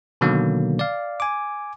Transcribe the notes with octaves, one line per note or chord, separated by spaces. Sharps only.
B2 D3 D#3 F#3 A#3 B3
D5 F5
G#5 D6